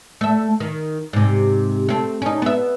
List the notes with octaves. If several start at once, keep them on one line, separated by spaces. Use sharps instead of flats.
A3 E5
D#3
G#2 C3
A3 C4
C#4 D#4
B3 E5